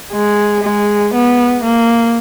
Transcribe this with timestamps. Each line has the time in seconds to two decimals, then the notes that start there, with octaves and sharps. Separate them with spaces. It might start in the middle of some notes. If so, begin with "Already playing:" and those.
0.12 G#3
0.63 G#3
1.14 B3
1.64 A#3